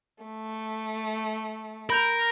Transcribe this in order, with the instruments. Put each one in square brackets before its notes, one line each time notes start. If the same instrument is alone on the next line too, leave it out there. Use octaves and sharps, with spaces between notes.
[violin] A3
[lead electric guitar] A#4 [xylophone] B5 G6 F7